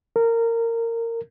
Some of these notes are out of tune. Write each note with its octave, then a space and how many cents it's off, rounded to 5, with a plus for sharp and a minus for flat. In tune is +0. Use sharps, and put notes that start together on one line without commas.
A#4 -20